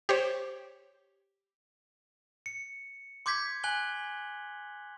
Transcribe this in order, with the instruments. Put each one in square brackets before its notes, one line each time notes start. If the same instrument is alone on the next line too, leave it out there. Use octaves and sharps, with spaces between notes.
[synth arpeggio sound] G4 C5 C#5
[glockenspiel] C#7
C6 D6 G6 G#6 B6
G#5 F#6 F#7 G7